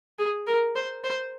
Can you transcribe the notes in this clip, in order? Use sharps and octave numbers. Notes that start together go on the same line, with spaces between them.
G#4
A#4
C5
C5